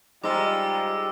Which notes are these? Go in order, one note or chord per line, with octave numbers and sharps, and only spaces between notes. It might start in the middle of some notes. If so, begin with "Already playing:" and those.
G3 G#3 D#4 F4 C5 A#5 D6 E6